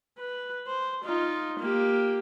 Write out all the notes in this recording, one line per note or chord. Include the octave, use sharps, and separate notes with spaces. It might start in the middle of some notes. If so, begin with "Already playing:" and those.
B4
C5
D#4 F4
A#3 G4